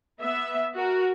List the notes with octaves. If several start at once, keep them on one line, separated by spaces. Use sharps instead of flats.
B3 E5
F#4 A#4